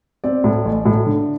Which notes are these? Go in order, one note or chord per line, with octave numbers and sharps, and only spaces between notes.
C4 D5
A2
A1
A2
D3